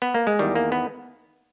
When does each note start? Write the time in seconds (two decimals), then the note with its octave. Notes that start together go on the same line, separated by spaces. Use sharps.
0.02 B3
0.14 A#3
0.27 G#3
0.39 E2 D#3 G3
0.55 A#3
0.72 B3